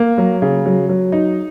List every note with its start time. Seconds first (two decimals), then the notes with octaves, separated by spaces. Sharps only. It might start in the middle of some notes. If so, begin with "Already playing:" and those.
Already playing: A#3
0.18 F#3
0.42 C#3
0.66 F#3
0.89 F#3
1.12 D#4